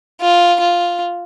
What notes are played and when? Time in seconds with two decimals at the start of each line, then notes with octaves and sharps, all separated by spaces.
0.21 F4
0.60 F4